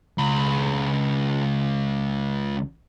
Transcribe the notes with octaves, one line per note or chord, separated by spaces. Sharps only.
C#2 B5